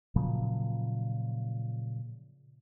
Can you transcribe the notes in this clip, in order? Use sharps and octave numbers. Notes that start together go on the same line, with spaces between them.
A#2 C#3 F3 F#3